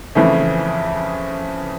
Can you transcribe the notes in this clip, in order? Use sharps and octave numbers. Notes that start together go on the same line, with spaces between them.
F2 C#3 E3 A3